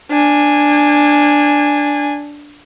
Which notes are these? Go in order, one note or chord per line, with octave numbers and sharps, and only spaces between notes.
D4 G#5